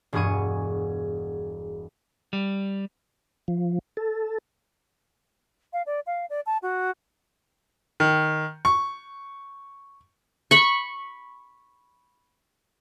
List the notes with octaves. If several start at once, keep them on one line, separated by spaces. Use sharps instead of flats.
E1 G2 B3 G#4 C#6 D#7
G3
F3
A4
F5
D5
F5
D5
A5
F#4
D#3
C#6
B5 C#6